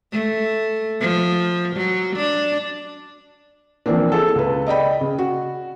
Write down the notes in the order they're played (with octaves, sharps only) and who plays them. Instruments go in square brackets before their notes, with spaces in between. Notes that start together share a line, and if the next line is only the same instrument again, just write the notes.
[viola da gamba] A3
F3
F#3
D4
[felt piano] E3 F3 A#3 C4 D4
E4 G#4 A4
C#2 B4
D5 D#5 G5 B5
C#3
F#4